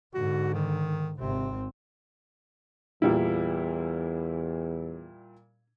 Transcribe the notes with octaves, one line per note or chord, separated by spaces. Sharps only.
G#2 D3 F#4
D#3
G#1 C3 C4
E2 A#2 G3 E4